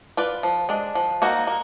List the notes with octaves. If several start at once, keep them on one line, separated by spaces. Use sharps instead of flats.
F4 B4 D5
F3
G#3 D4
F3
A#3 D#4 F#4
A#3